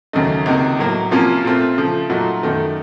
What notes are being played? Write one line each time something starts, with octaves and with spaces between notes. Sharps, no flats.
D#2 C#3 F#3 A3 D#4
C#2 C3 D#3 A#3 D#4
A2 F#3 A#3
C3 F3 A#3 C#4 F4
A#2 A3 C4 F4
C#3 F3 A3
A#2 F#3 A3 D#4 F#4
F#2 D#3 A3 D#4